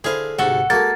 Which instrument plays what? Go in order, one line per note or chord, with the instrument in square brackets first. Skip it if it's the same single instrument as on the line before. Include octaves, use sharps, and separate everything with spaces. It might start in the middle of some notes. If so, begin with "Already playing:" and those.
[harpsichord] D3 E4 C5 [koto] G#4 F5
[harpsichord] D2 G#2 C3 [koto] F#4 A4 [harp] F#5
[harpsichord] G#3 F#4 A4 [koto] A#3 [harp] G#6 [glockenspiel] A6